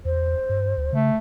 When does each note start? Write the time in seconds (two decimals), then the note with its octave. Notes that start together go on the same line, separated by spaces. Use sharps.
0.05 E2 C5
0.49 G2
0.77 D2
0.92 C#3 A3